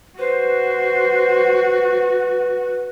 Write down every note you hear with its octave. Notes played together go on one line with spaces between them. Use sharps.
F#4 B4 C5